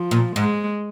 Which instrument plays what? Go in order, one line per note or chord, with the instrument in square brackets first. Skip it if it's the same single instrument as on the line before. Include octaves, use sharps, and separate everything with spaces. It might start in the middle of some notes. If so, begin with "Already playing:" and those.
Already playing: [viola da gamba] F3
[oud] A#2
[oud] G#2 [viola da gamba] G#3